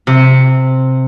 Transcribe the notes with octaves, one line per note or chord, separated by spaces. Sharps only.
C3